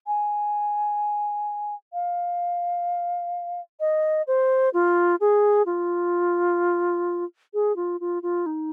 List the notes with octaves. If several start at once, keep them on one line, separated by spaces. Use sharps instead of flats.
G#5
F5
D#5
C5
F4
G#4
F4
G#4
F4
F4
F4
D#4